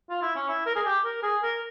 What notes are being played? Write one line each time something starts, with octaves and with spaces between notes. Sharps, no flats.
F4
E4
C#4
E4
A#4
G#4
G4
A#4
G#4
A#4